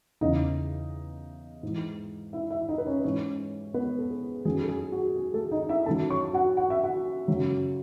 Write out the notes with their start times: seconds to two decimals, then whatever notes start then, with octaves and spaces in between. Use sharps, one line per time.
0.21 E2 C#3 E3 D#4 D#5
1.63 G#2 E3
2.33 E4 E5
2.51 E4 E5
2.69 D#4 D#5
2.78 B4
2.87 C#4 C#5
3.04 G#2 E3 C#4 C#5
3.74 B3 B4
3.99 A4
4.10 G#4
4.45 F#2 D#3 F#3 G#4
4.63 A4
4.69 G#4
4.92 F#4
5.16 G#4
5.33 A3 A4
5.51 D#4 D#5
5.69 E4 E5
5.86 F#2 D#3 F#3 A4 A5
6.10 C#5 C#6
6.33 F#4 F#5
6.57 F#5
6.70 E5
6.83 F#4 F#5
7.28 F#2 C#3 F#3